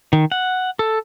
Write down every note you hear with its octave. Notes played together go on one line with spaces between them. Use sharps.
D#3
F#5
A4